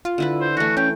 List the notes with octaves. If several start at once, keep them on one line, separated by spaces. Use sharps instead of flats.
F4
D3 E4 B4
C5
E3 A3 F#4
C#4 G5